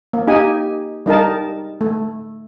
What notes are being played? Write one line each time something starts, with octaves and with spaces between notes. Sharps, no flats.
A#3
D#4 G4 G#5
G3 D#4 A#4 A5
A3